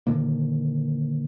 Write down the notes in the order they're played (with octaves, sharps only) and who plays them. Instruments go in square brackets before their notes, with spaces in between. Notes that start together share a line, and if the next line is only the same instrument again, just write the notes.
[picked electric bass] A#2 D3 D#3 A#3